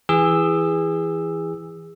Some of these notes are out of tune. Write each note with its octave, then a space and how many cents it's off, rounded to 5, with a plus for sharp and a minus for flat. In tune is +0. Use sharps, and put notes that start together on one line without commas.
E3 +0 G#4 -25 E6 +0